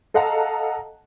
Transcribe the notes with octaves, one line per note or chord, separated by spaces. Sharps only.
A4 D#5 F5 F#5 A5 A#5